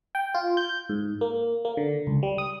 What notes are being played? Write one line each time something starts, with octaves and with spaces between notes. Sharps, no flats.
G5
F4
G6
G#2
A#3
A#3
D3
C#2
G3
D#6